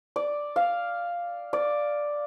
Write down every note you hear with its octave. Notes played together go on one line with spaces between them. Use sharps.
D5
F5
D5